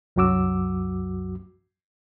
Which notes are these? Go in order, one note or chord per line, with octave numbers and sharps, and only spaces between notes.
C2 F#2 F#3 F#4 D6 E6